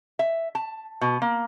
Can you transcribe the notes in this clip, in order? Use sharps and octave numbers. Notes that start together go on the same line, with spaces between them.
E5
A5
B2
A#3